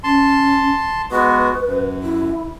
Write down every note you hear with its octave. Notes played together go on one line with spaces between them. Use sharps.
C#4 A5 C6
G#3 B3 F#4 B4
F#2
E4